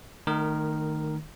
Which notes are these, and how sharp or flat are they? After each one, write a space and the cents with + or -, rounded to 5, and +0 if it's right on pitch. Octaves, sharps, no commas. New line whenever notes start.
D#3 -20 A3 +15 A#4 +0